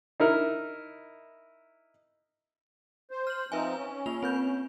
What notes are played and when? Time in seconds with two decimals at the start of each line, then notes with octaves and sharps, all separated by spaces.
0.20 D#4 E4 A#4
3.11 C5
3.27 F6 F#7
3.52 F3 C4 D#4 B4 E5 G#5
3.77 C#4
4.06 A#3 F4 F7
4.23 C4 B4 G6